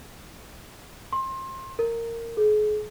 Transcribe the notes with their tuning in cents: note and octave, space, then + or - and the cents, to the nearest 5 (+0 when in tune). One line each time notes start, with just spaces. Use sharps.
C6 +25
A#4 -15
G#4 +35